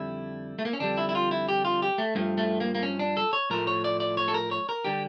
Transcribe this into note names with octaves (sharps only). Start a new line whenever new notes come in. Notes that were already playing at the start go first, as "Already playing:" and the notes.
Already playing: F2 D3 G3 E4
A3
A#3
C#4
F2 D3 G3 D4
E4
E4
F4
E4
G4
F4
G4
A3
G2 F3 A3 A#3
A3
A#3
A#3
C#4
D4
A4
C#5
A2 F3 A3 A#4
C#5
D5
D5
C#5
A4
A#4
C#5
A#4
D3 G3 G4